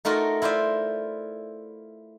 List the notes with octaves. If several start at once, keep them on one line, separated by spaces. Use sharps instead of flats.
A3 D#4 F4 F#4 A#4
E4 F4 C5 D5 E5